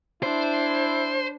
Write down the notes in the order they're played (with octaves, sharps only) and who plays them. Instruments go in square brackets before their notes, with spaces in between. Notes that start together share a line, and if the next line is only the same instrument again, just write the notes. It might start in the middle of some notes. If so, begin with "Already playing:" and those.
[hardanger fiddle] D4 [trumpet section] E4 [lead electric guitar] C5